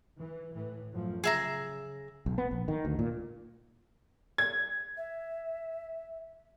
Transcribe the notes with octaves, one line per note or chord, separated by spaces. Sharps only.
E3
A2 E3
F#2 A2 F3
C#3 G#4 E5 A#5
B1
B3
A#1
D#3
D2
A#2
G#6
E5